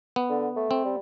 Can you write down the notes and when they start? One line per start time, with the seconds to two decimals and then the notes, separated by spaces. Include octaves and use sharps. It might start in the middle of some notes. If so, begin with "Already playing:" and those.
0.16 B3
0.30 D3
0.56 A3
0.71 C4
0.85 G3